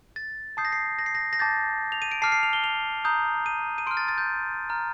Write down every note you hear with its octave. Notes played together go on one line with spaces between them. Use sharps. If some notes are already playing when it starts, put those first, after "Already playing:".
A6
A5 D#6 G6 C7
A#6
C7
A#6
C7
A#6
A#6
A5 D6 G6 A6
F7
D#7
D7
A5 D6 F6 C7
C7
F7
G7
F7
A#5 D#6 G6
D#7
D#7
C6 F6 D7
A6
A6
G6
A#5 F6